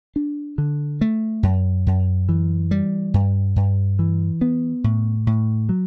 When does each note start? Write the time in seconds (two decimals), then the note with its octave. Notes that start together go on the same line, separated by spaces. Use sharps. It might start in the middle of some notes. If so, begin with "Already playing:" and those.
0.16 D4
0.58 D3
1.01 A3
1.43 F#2
1.87 F#2
2.29 E3
2.71 G3
3.14 G2
3.56 G2
3.99 E3
4.41 B3
4.84 A2
5.27 A2
5.69 F#3